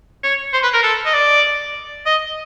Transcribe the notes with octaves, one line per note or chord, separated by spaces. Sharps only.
C#5
C5
B4
A#4
A4
D#5
D5
D#5